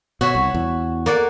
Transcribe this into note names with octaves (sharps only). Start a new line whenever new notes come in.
B2 F#4 C#5 E5
C2
E2
A#3 D5 F#5